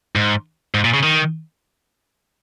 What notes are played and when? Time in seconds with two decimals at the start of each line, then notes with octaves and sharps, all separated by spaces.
0.15 G#2
0.74 G#2
0.84 A#2
0.94 C#3
1.03 D#3